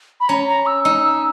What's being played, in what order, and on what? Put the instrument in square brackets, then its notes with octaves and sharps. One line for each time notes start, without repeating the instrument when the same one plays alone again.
[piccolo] B5
[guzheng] C#4 [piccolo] A#5
[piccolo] A#5
E6
[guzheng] D#4 [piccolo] E6
[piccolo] E6